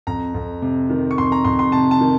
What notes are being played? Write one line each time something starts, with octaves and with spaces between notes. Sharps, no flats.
F2 A#5
F2
C3
D#3
C#6
F2 C6
A#5
F2 C6
C6
C3 A5
A5
D#3